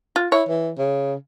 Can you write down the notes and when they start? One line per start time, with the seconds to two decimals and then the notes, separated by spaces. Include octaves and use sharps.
0.16 F4
0.32 E4 C#5
0.48 E3
0.78 C#3